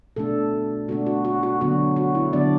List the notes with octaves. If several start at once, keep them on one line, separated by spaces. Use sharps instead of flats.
B2 A3 D4 A4
B2 A3 D4 F#4
F#4
F#4
F#4
D3 F#3 B3 D4 F#4
F#4
E4
D3 F#3 B3 D4 D5